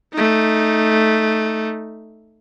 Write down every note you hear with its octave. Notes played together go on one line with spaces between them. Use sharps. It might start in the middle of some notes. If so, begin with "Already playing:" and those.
A3 D#4